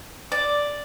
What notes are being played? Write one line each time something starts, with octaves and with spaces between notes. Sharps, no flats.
D5